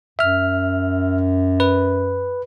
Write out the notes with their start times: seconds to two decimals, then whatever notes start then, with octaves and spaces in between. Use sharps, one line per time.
0.19 F#2 E5 F6
1.60 B4